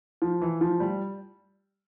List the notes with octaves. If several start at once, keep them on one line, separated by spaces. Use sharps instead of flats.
F3
E3
F3
G3